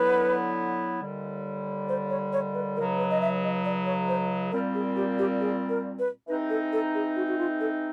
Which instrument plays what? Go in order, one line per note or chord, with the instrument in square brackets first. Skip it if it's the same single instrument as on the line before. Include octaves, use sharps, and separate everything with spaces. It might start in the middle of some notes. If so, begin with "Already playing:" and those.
Already playing: [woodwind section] D3 F#3 B3 E4 [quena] B4
[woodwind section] D#2 D3 G3
[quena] C5
C#5
C#5
B4
[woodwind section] C#2 C#3 F#3 [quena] A#4
[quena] B4
D#5
E5
D#5
D5
C#5
C5
[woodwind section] A#2 G3 C4 [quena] A#4
[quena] G#4
G4
G4
G#4
A#4
B4
[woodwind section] E3 G#3 C4 D#4 [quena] B4
[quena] A4
A4
G#4
F#4
F#4
F4
A4